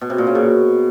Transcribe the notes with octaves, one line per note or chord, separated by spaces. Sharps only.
B2
C3
A#2
C#3
B2